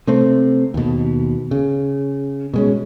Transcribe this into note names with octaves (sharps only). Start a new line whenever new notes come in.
C3 A3 C4
D#2 B2
C#3
B2 G#3 C#4